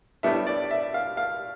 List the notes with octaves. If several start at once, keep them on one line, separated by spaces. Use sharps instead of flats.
A2 G3 B3 D4 E5
D5
E5
F5
F5